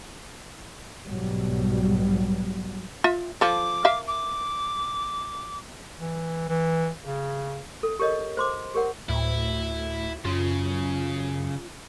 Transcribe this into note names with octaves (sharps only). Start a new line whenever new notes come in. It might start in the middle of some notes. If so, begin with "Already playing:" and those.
B1 G#2 B2 F#3 G3
F4 E5
F3 A4 D6
A#4 E5 F5
D6
E3
E3
C#3
A4
G4 A#4 C#5 D#5
C5 C6 D6
G4 A#4 C#5 F#5
D2 A2 E4
F#2 C#3 F4